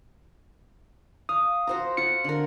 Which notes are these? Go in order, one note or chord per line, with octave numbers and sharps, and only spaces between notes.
F5 D#6
F#4 C5 A#5
F4 F#4 F#5 C#7
D3 A#4